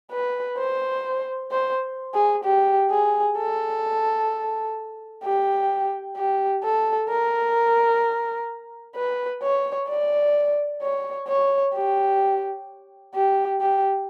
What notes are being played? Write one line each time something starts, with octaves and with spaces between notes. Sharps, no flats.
B4
C5
C5
G#4
G4
G#4
A4
G4
G4
A4
A#4
B4
C#5
D5
C#5
C#5
G4
G4
G4